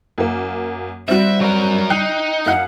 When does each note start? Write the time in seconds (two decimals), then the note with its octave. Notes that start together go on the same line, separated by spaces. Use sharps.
0.18 F#2 A#3
1.08 G3 C4 F#4 E5
1.41 F#3 A#4
1.90 D#4 G5 F#6 C7
2.46 F#2 F5 F#5 F#6